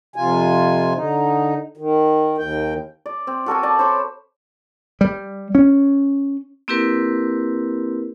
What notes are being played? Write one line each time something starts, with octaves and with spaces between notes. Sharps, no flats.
F2 C3 F4 G#5
D3 D#4
D#3
D#2 G5
D5
C4
F#4 A4 A#4 G#5
D5 A5
C5 C#5 B5 D6
G3
C#4
A#3 C4 E4 G4 A#4 B4